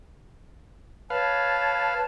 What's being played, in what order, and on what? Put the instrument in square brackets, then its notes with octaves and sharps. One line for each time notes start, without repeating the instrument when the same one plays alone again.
[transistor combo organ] B4 F5 [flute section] C#5 A5